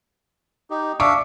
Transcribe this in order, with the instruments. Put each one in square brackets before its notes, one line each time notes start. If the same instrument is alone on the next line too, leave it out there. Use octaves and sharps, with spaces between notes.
[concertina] D#4 G4
[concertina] D4 E5 F5 [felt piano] C#6 D6